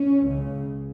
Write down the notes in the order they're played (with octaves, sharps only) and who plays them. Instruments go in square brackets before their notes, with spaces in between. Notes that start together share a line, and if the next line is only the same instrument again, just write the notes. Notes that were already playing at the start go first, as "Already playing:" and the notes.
Already playing: [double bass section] C#4
C#2 C#3